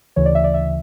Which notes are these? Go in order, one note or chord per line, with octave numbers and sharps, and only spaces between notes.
D2 C#3 E3 C#5
D5
E5
D5
E5